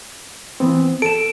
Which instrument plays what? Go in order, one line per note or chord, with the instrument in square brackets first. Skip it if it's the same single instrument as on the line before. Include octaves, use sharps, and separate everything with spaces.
[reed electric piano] E3 B3 C4
[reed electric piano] A4 [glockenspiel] D7 E7